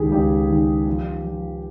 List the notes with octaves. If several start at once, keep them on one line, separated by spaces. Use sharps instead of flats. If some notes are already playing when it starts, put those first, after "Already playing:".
Already playing: C#2 D#3 G4 G#4
C#2 G4
D#3
F3
F3